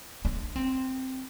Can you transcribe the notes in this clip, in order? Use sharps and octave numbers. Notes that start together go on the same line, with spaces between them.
D4
C4